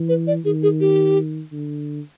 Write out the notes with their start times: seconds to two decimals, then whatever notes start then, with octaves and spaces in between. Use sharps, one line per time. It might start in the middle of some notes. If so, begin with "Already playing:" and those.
Already playing: E3
0.09 B4
0.27 D5
0.45 D#3 G#4
0.63 G#4
0.80 G4
1.52 D3